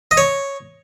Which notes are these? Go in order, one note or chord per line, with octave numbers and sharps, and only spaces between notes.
D#5
C#5